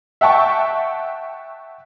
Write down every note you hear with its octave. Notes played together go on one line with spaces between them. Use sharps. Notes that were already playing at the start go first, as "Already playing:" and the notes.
E5 F#5 G5 A5 C#6